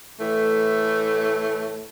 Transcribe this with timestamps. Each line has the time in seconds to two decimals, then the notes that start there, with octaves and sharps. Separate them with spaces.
0.20 A2 E3 A3